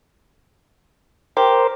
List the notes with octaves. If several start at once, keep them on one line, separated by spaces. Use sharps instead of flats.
G4 A#4 C5